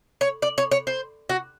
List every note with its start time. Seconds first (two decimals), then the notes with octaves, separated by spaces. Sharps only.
0.21 C#5
0.42 D5
0.58 C#5
0.71 C#5
0.87 C5
1.29 F#4